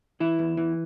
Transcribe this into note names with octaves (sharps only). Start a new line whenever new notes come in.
E3 E4
E2
E3